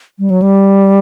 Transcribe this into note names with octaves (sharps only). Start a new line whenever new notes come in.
G3
F#3
G3